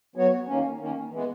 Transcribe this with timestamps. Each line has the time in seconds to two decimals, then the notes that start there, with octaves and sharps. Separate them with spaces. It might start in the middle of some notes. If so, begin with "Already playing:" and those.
0.16 F#3 B3 F#4 C#5
0.47 D#3 A#3 C#4
0.79 D#3 A#3 C#4
1.11 E3 G#3 B3